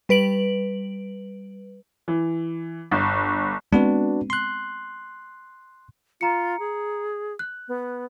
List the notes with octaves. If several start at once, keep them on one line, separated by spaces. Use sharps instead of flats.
G3 B4 D7 F#7
E3
G1
G#3 B3 C4 D4 F#4 B4
C6 F#6
F4 A#5 C#7
G#4
F#6
B3